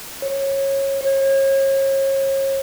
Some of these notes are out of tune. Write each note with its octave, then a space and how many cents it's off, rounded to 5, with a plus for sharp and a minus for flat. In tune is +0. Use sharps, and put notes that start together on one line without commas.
C#5 -20
C#5 -35